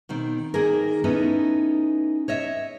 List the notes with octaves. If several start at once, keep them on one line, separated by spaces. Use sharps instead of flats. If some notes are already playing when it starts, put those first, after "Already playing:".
B2 D#3 C4
D#3 A#3 G#4 A#4
B3 C#4 D#4 E4 A4
C#5 D#5 E5